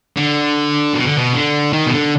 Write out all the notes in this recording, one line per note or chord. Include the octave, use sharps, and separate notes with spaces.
D3
B2
D3
B2
D3
D#3
B2
D3